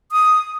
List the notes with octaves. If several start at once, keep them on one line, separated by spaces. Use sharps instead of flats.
D#6